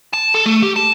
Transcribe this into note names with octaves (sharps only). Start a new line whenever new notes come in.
A5
A4
A3
G4
A5